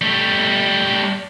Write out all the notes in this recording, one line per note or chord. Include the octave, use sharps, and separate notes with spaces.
G3 A3